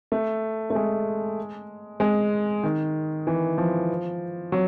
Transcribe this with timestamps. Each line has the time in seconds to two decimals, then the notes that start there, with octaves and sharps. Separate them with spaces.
0.12 A3
0.70 A3
0.75 G#3
2.00 G#3
2.63 D#3
3.27 E3
3.58 F3
4.52 F#3